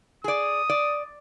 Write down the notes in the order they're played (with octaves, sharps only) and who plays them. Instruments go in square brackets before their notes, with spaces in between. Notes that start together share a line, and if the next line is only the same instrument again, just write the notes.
[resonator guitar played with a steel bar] G#4 D5 [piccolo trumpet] D#6
[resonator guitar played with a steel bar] D5